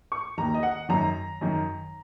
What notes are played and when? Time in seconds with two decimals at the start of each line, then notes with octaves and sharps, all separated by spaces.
0.12 C#6
0.38 D#2 D#3 A#5
0.54 D#5
0.63 F#5
0.89 F#2 D#3 A#5
1.41 F#2 D#3